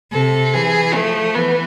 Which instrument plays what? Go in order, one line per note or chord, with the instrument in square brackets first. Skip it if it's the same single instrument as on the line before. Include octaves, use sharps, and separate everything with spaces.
[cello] C3 [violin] A4
[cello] E3 [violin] G#4
[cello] F3 [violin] A3
[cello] E3 [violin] B3